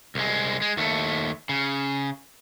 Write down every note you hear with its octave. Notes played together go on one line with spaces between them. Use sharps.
C2 G#3
G#3
D#2 A3
C#3